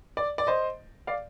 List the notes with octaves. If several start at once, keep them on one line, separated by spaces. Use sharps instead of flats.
D5
D5
C5 D#5
D5 F5